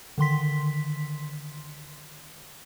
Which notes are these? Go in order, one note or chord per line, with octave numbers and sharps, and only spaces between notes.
D3 D#3 C6 B6